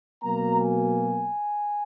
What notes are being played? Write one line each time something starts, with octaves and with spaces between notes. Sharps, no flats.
B2 F#3 A#3 A#5
G#5